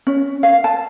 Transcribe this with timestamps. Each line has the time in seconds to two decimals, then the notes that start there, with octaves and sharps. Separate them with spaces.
0.07 C#4
0.43 F5
0.64 A5